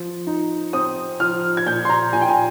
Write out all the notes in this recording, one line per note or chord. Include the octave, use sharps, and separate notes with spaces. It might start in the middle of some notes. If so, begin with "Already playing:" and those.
Already playing: F3
D#4
C4 D#6
F3 F6
G#6
A#2 G6
C6
A#5
A#2 G#5
G5
G#5